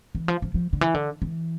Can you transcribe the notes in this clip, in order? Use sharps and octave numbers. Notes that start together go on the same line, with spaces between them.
E3
F3
F3
F3
D3
E3
D3
E3